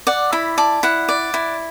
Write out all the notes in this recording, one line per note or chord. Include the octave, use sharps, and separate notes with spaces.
D5 F#5
E4 B5
D5 A5
E4 F#5
D5
E4